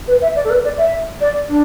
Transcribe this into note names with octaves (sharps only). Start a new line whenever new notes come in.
B4
E5
D5
A4
B4
D5
E5
D5
D4